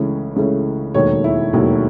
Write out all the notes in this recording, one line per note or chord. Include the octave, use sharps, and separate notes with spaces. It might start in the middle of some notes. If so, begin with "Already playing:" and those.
Already playing: C#2 C#3 E3 A3 C#4
C#2 C#3 E3 A3 C#4
E1 D#2 D#3 F#3 A3 C#5
E4
E1 D#2 D#3 F#3 A3